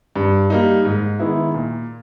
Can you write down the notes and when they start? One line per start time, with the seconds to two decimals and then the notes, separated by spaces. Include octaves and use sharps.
0.16 G2
0.50 G3 A#3 D#4
0.85 G#2
1.19 D#3 G#3 B3 E4
1.54 A#2